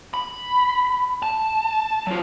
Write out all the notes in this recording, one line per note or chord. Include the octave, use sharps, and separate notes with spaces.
B5
A5
F#3 F4